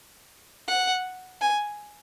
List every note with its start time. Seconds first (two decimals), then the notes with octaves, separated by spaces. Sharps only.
0.68 F#5
1.41 G#5